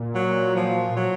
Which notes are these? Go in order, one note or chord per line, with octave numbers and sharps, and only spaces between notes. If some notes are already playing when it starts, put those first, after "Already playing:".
Already playing: A#2
F#3
F3
F#3